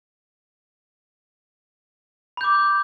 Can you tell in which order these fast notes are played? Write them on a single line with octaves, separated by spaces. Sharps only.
B5 G6 D6